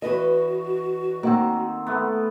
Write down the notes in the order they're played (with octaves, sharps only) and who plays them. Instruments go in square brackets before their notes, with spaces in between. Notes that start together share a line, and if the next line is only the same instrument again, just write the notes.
[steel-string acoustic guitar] E2 B4 D#5 [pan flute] F#4
[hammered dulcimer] D#3 C4 [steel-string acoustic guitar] A#3 F#5
[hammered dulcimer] A3 B3